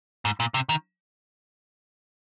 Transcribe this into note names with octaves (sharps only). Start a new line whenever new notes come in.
G#2
A#2
C3
D#3